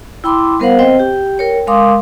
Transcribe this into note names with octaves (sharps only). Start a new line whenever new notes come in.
E4 G5 B5 C6 D6
G3 B3 A#4 C5 F5 F#5
C4 C5 D#5 G5
G4 G5
A#4 C#5 G5
G#3 A#4 F5 C6 D6 D#6